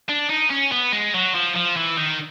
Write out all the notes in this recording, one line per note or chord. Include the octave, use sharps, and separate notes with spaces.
D4
D#4
C#4
B3
G#3
F#3
F3
F3
E3
D#3